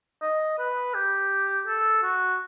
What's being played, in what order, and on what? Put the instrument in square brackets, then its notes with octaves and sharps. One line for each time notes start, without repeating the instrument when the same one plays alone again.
[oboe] D#5
B4
G4
A4
F#4